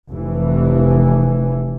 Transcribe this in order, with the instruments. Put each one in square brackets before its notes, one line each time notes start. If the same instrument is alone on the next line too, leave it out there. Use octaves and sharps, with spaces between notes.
[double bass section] F1 E3